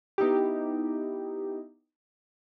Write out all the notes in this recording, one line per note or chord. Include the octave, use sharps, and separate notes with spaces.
B3 D#4 E4 G4